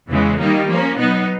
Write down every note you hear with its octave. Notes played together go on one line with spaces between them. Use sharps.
E2 C#3 E3 G#3
D#3 G3 A#3 D#4
F3 A#3 C#4
B2 F#3 B3 D#4